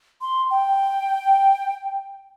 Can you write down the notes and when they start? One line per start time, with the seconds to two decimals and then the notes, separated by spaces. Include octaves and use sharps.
0.21 C6
0.51 G5